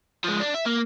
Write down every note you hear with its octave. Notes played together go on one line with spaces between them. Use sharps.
F3 G#3
D4
E5
A#3